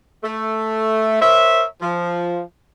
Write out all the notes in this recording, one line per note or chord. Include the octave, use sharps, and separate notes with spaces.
A3
A#4 C5 C#5 E5
F3